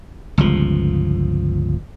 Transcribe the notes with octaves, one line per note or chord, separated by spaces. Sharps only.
G1 C#2 F3